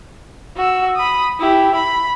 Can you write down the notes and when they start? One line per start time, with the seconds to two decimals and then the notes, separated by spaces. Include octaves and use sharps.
0.56 F#4 E6
0.95 B5 D#6
1.39 E4 G4
1.75 B5